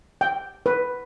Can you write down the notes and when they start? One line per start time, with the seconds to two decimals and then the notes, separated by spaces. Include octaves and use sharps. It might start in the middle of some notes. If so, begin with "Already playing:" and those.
0.21 G5
0.66 B4